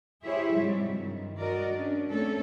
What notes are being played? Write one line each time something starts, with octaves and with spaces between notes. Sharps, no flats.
E4 G4 G#4 C5 C#5 E5
G#2 C3 F#3 G3
G2 D#3
F#4 A#4 D5 D#5
C#4 D4
A3 A#3 C4 C#4 A4 C#5